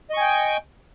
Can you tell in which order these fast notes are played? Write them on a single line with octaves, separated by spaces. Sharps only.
D#5 C#6 G#5 G5